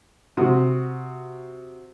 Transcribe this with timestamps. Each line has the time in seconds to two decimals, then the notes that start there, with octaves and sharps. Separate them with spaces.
0.37 C3 F#4 D#6